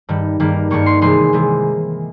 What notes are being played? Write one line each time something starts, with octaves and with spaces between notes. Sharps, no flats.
G2 D#3 G3
G2 D#3 G3 A#3
G2 D#3 G3 A#3 C#6
C6
C3 E3 G#3 C6
C3 E3 G#3